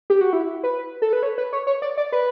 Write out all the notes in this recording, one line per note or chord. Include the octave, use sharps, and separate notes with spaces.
G4
F#4
E4
B4
A4
B4
C#5
B4
C#5
C#5
D5
D5
B4